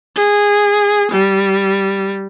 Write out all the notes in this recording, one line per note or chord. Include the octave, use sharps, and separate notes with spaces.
G#4
G3